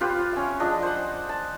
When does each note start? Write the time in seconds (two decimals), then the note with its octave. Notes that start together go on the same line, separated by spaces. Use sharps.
0.01 F4 G4 B4 C5
0.32 C#4 E5
0.60 F3 D4 G#4 D#5
0.83 C5 F#5
1.29 A5